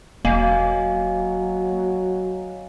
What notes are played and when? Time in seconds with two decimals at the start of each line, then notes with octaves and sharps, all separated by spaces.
0.25 E1 F#3 A#3 D#5 F5 G#5